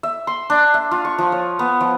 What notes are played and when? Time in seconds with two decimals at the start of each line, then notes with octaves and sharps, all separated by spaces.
0.03 E5
0.27 C6
0.50 D4
0.74 E5
0.91 F4
1.05 C#6
1.18 F3
1.32 C#5
1.59 B3
1.81 F3